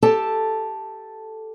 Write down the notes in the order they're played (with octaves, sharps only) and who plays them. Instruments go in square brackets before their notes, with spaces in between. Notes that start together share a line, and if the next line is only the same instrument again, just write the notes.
[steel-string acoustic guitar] G4 A4 A5